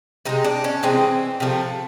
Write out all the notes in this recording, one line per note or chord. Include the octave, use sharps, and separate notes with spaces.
C3 E3 G#3 D#4
D4
C#4
C3 E3 G#3 C4
C3 F3 A3